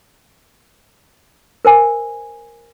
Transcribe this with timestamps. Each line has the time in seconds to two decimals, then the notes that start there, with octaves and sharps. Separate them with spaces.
1.65 A#4 C5 G#5